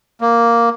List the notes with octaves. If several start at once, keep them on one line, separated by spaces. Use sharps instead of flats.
A#3